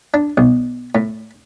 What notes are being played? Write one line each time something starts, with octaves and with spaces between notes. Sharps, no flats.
D4
B1
A2